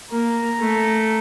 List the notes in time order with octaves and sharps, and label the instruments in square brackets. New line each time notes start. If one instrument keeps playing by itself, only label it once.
[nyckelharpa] A#3 [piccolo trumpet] A#5
[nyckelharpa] A3